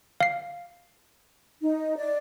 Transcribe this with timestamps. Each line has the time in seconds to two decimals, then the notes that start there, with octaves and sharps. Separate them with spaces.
0.20 F5 C7
1.62 D#4
1.97 D5